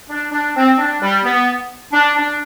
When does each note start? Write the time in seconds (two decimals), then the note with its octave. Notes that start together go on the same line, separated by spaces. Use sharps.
0.09 D4
0.32 D4
0.56 C4
0.78 D4
1.01 G3
1.24 B3
1.92 D4
2.16 D4